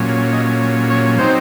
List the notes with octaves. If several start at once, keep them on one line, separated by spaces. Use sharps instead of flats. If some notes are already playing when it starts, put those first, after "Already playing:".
Already playing: A#2 F#3 C#4
D#5
C#5
F#3 C4 D#4 C5